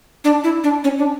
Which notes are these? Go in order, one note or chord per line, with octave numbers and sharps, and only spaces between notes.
D4
E4
D4
C#4
D4